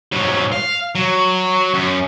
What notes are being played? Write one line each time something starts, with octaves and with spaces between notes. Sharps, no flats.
G#2 F#3
F5
F#3
F#2